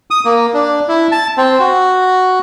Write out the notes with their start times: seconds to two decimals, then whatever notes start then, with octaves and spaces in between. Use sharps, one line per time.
0.11 D#6
0.25 A#3
0.54 D4
0.88 E4
1.12 A5
1.37 C4
1.60 F#4